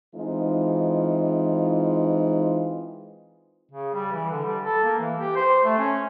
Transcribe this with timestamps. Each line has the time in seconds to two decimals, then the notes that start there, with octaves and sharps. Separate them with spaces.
0.16 E3 G#3 C4 D#4 F4
3.71 C#3
3.94 G3
4.12 E3
4.31 D3
4.44 G3
4.64 A4
4.84 A#3
4.99 E3
5.18 G4
5.36 C5
5.65 A3
5.78 C#4